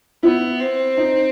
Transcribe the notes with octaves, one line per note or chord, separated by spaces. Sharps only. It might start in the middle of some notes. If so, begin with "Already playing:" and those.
B3 E4
C4
D#4